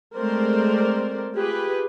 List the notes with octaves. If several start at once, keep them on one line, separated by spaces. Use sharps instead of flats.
G#3 A3 C4 A#4 C5 D5
F4 G4 G#4 B4